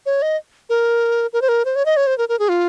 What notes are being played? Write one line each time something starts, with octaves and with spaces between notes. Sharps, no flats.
C#5
D#5
A#4
A#4
C5
A#4
C5
C#5
D#5
C#5
C5
A#4
A#4
G#4
F4